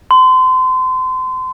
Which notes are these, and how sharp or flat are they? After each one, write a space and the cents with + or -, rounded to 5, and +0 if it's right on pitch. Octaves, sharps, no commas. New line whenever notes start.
C6 -30